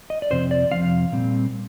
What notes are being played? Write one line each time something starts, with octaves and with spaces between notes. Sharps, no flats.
D#5
D5
F2 C3 F3 C4 C5
D5
F2 C3 F3 C4 F5
A#2 G3 C4